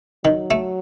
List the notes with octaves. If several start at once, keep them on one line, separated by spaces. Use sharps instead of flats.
D#3 F#3
A3